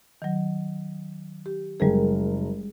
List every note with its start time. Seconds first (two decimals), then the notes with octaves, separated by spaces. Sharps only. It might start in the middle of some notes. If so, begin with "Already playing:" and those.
0.22 D#3 F#3
1.46 G4
1.80 F#1 G3 G#3 G#4 A#4